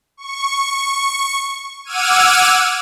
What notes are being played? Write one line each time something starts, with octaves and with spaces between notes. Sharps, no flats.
C#6
F#5 D6 E6 F6 G#6 D#7